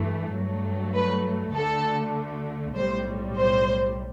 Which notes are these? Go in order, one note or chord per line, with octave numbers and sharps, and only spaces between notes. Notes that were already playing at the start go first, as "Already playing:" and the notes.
Already playing: G2 E3 A3
G2 F#3 A3
B4
D2 D3 A3 A4
B1 A2 G3 C5
C5